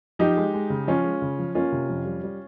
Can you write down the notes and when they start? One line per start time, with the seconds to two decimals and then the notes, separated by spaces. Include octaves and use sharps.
0.19 F3 D#4 G4
0.37 G#3
0.54 G#3
0.70 C#3
0.87 F3 C#4 F4
1.04 G#3
1.22 C#3
1.39 F3
1.55 A#3 C#4 F4
1.72 C3
1.89 F2
2.06 G3
2.24 G3